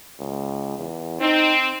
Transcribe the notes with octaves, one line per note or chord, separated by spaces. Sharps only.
C#2
E2
C4 D#4